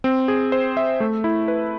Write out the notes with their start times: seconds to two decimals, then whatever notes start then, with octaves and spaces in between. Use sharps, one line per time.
0.04 C4
0.28 G#4
0.52 C5
0.77 E5
1.00 A3
1.24 E4
1.48 B4